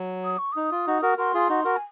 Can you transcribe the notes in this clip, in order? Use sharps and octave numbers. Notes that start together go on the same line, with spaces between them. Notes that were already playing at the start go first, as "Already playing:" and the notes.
Already playing: F#3
D#6
C#6
D#4 D#6
F4
D#4 F#4
F#4 A#4
F#4 A#4 C6
F4 G#4
D#4 F#4
F#4 A#4
G#5